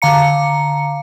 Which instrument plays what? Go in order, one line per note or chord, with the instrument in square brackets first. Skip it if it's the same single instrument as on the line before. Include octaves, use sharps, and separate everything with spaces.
[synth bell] D3 F5 A#5 C#7